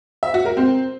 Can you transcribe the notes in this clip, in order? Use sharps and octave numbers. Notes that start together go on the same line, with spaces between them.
E5
F#4
A#4
C4